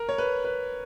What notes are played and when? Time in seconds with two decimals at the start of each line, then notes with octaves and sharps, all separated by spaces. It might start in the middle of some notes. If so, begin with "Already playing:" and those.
Already playing: A#4
0.09 C#5
0.18 B4
0.44 B4